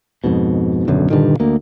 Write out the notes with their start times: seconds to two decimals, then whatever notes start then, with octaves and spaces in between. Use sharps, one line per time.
0.24 F2 G#2 B2
0.87 D#1 B1 F#2 D3
1.10 G2 A#2 D3 D#3
1.40 D2 A#3